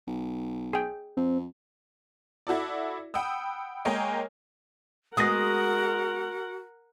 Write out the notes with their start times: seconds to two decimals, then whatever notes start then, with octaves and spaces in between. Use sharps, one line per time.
0.07 B1
0.73 G#4 G5
1.17 F2 C4
2.47 E4 F#4 A4 D5
3.14 F#5 G5 B5 D#6 E6
3.85 G#3 A#3 C#5 D#5 G5 G#5
5.17 G#3 B3 F#4 A#4 F#5 D#6 A#6